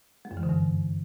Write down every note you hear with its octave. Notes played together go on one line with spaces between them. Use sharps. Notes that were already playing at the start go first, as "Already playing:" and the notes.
G#3
F#2
E3
D3
G2